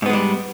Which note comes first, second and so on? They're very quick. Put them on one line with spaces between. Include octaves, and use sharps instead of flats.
G#2 B3 G#3 G3